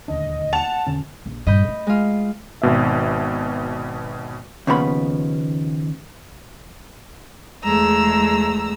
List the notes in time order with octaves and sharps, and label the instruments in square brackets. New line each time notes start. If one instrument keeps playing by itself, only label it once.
[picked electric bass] D#1 D2 D4 [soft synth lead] D#5
[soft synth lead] F#5 [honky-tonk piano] A5 F7
[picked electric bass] E1 D3 C#4
[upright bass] A#1
[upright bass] G2 A#2 [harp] D#5 B5 G6
[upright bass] A3
[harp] G#3 F4
[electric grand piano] G#1 B2 E5
[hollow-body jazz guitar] D#2 C#3 F3 B3 B5
[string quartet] E2 G#3 A3 A#5 E6